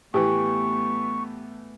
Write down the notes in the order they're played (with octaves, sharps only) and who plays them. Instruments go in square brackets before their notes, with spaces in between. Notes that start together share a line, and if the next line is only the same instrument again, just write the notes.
[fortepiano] A2 E3 [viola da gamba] A3 B3 [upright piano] G4 [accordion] C#6